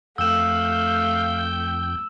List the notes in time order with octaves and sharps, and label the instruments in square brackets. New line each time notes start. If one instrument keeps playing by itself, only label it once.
[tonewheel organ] F2 G5 G6 [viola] A3 [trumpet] F5 [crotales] E6 E7